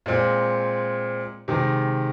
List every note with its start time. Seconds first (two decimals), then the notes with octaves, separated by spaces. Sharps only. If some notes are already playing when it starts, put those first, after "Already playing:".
0.06 A#2 G#3 C4
1.48 C3 D#3 G#3